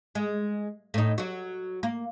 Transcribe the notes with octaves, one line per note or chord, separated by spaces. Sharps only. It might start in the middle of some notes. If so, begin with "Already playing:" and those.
G#3
A2 D#4
F#3 F#4
A#3